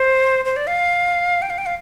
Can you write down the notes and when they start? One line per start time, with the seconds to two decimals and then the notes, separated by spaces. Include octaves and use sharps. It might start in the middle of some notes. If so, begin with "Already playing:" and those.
Already playing: C5
0.45 C5
0.56 D5
0.67 F5
1.42 G5
1.50 F5
1.58 G5
1.66 F5